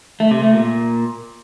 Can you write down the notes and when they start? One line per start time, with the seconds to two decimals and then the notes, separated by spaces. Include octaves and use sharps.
0.20 A3
0.31 C3
0.42 A3
0.53 A#2